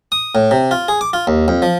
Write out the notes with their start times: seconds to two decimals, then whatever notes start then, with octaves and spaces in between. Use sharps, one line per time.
0.12 D#6
0.35 A2
0.51 C3
0.71 F4
0.88 G#4
1.01 D6
1.13 F4
1.27 D#2
1.48 F2
1.62 F3